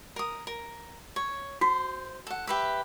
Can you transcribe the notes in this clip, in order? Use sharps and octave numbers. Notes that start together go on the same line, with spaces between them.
A#4 D#6
A#4
C#5
F#4 C5
A4 F#5
G4 B4 E5